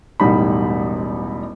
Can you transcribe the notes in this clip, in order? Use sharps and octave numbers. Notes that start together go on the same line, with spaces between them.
E1 A1 G3 D#4 B5